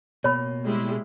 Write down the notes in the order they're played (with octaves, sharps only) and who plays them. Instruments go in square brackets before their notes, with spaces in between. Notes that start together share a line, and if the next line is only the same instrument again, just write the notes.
[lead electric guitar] B2 A#3 [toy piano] C#5 B5
[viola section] G3 G#3 E4